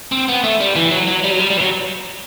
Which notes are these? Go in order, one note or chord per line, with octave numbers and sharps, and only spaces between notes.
C4
B3
A3
G3
E3
F#3
F#3
G3
F#3
G3
G3
E3
F#3